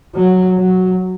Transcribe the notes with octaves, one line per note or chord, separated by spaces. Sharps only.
F#3
F#3